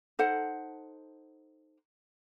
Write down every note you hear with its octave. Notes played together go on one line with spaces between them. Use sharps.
D#4 A4 C5 F#5